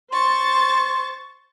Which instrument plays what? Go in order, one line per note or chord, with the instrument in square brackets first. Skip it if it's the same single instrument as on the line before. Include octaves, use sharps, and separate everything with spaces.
[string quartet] C5 C#6 A6 [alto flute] C6